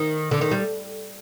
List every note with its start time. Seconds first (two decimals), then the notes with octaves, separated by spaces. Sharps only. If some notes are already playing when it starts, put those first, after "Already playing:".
Already playing: D#3
0.31 D3
0.41 D#3
0.51 G3